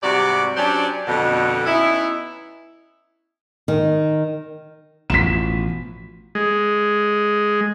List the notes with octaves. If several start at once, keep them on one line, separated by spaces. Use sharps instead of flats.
G#2 C3 G3 F#4 G4 D5
F#3 C#4 D4 G4 C5 D5
F2 B2 D3
B3 C#4 D#4 E4
D#3
A1 B2 F3 B6 E7
G#3